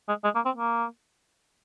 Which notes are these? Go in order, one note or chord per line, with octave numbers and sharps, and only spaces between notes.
G#3
G#3
A#3
C4
A#3